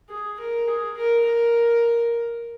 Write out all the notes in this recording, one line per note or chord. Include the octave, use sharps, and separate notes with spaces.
G#4
A#4
G#4
A#4
A#4